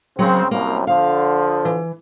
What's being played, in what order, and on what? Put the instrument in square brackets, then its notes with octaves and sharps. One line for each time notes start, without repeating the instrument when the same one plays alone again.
[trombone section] C#3 C4 [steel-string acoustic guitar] F#3 A#3 F#4
[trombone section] C2 F#2 [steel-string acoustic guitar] A#3
[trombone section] D3 F3 [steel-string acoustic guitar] F5
[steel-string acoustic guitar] E3